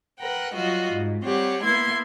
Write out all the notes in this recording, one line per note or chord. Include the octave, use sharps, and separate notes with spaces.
A#4 B4 F#5 G5
F#3 G3 F4 F#4 D#5
G#2
G3 C4 G4 C#5 F#5
A#3 B3 E4 C6 G#6